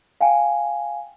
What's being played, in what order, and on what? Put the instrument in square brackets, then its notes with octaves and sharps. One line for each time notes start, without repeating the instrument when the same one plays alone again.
[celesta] F5 G5 G#5